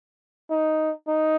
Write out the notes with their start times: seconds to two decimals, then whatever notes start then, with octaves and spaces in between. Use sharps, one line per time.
0.50 D#4
1.08 D#4